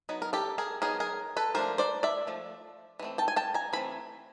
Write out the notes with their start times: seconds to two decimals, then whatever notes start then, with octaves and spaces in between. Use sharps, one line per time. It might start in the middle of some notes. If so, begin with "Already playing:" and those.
0.09 F#3 B3 D#4
0.22 A#4
0.33 G4 A4
0.58 G#4 A#4
0.82 F#3 B3 D#4 G#4 A#4
1.00 G#4 A#4
1.37 A4 B4
1.55 F3 A3 D4 A#4 C5
1.78 C5 D5
2.03 D5 E5
2.27 F3 A3
3.00 E3 A3 C4
3.18 G5 A5
3.28 G#5
3.36 G5 A5
3.54 G#5 A#5
3.73 E3 A3 C4 B5